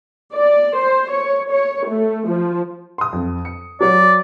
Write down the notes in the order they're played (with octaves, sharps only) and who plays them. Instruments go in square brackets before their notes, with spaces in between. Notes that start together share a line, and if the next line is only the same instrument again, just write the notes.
[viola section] D5
C5
C#5
C#5
A3
F3
[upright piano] C6 D#6
F2
C#7
[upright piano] F#3 C#5 [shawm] D5